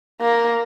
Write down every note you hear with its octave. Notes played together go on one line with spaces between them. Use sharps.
A#3